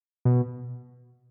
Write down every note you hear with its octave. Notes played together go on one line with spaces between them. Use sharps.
B2